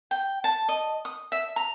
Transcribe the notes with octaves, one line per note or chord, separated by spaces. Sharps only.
G5
A5
D#5
D#6
E5
A#5